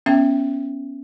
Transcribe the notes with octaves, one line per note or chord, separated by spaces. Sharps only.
B3 C#4 E5 G5